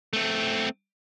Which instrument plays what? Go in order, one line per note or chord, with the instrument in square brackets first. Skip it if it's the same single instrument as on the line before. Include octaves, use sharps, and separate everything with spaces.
[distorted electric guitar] A3 C4